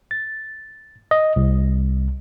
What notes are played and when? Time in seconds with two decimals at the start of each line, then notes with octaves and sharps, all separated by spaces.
0.11 A6
1.11 D#5
1.36 C2